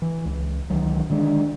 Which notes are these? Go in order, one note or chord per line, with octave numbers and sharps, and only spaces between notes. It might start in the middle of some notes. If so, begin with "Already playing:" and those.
E3
C#2
C#2 D#3 E3 F#3
D3 D#3 G#3 D4